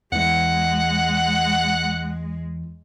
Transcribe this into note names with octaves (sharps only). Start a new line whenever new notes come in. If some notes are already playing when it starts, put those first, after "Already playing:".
E2 E3 G#3 F#5